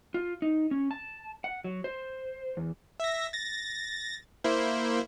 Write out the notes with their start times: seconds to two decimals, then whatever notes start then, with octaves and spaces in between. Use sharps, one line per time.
0.14 F4
0.42 D#4
0.71 C#4
0.91 A5
1.44 F#5
1.64 F#3
1.84 C5
2.57 E2
3.00 E5 A#6
3.33 A6 A#6
4.44 A#3 E4 C5